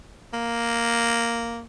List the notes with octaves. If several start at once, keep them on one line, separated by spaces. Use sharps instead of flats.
A#3